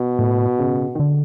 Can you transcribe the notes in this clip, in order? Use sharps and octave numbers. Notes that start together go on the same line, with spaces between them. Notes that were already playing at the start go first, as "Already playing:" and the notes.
Already playing: B2
A2
C#3
D#3
D3